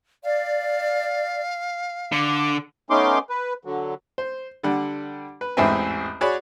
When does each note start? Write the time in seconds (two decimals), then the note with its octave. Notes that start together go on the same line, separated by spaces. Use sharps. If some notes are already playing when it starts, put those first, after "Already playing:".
0.23 D5 F5
2.12 D3 D6
2.90 A3 B3 C#4 D#4 C6 D6
3.30 B4
3.65 D3 F#3
4.18 C5
4.63 D3 G3 F#5
5.41 B4
5.57 A1 E2 G#2 C4 E5 G#5
6.21 F#4 G#4 C#5 D5 B5